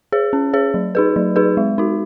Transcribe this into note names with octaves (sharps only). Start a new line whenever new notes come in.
G#4 C#5
C#4
G#4 C#5
F#3
D#4 G#4 B4
F#3
D#4 G#4 B4
G#3
D#4 F#4